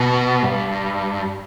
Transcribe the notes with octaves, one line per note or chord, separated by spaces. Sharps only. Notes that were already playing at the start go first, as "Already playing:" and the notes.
Already playing: B2
G2